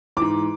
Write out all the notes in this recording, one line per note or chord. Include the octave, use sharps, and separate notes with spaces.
G#2 E3 D6